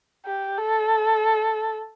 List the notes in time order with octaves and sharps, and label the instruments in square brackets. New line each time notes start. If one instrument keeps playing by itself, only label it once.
[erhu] G4
A4